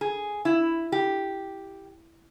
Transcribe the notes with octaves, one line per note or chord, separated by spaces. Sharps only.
G#4
E4
G4